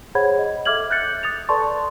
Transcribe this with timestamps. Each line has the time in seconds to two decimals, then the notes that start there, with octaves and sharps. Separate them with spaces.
0.15 G#4 C5 C#5 F#5 B5 G#6
0.39 D#5
0.65 A4 E5 D6 F6 G#6 F#7
0.90 F#6 G6 A6 C#7
1.23 D#6 A6 F7
1.49 A4 B4 D5 A5 C6 C#6